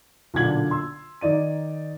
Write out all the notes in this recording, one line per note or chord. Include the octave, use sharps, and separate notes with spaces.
B1 A#2 D3 G#6 F#7
C6 E6
D#3 D#4 D5 D#7